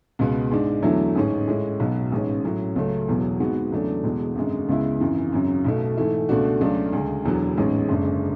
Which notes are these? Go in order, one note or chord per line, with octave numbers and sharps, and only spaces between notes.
C#2 B2 G#3 B3
G#2 G#3 D4
E2 D3 F#3 A3 E4
A1 G#2 G#3 C#4
A2 G#3 C#4
B1 B2 F#3 B3
A1 G#2 G#3 C#4
A2 F#3 C#4
C#2 C#3 F#3 A3 C#4
E1 E2 B2 F#3
G#1 G#2 G#3 B3 F#4
E2 C#3 F#3 A3 D4
E1 E2 B2 G#3
G#1 F#2 D3 G#3
C#2 C#3 G#3 B3 E4
G#1 F#2 E3
G#1 F#2 C#3 F#3
B1 B2 A3
G#2 E3 A3 E4
C#2 B2 A3 D4 F#4
C#2 C#3 F#3 A3 D4
D2 C#3 G#3
E1 E2 D3 F#3 B3
A1 G#2 G#3 C#4
F#1 F#2 D3 G#3 D4